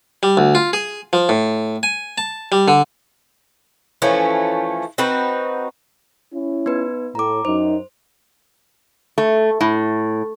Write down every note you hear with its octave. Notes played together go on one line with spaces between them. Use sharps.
G3
D2
F4
G#4
F3
A2
G#5
A5
G3
D3
E3 F3 A3 C#4
C4 D#4 F#4 B4
C#4 E4
B3 D#4 B4
A2 A#5 D6
F#2 D#4 C5
A3
A2